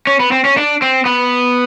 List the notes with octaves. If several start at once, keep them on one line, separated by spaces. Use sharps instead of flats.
C#4
B3
C4
C#4
D4
C4
B3